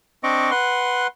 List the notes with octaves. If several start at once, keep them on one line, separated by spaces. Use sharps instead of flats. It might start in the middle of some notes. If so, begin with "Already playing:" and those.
C4 D4 D#5 C#6 D6
B4 F#5 C6